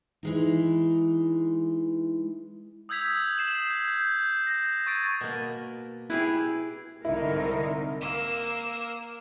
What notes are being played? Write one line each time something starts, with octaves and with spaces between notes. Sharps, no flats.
E3 G#3 D#4
D#6 E6 G6 G#6 B6 F7
D#6 C7 E7 F#7
G6
G6
G6 A#6
C#6 G#6 A6 D7
B2 A#3
E4 G4 G#4 B4
C2 G#2 D3 D#4 E4 A#4
A#3 E6